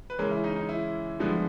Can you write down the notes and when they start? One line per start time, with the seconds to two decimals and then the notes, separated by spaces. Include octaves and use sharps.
0.10 B4
0.19 C#3 E3 G#3 C#4 A#4
0.31 E4
0.44 D#4
0.56 D#4
0.69 E4
1.19 G2 D3 F3 G#3 B3